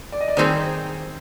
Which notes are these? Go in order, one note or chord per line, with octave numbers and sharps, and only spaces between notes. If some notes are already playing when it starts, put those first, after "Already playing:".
D5
D#5
D5
D#3 G3 C4 D#4 G#4 C5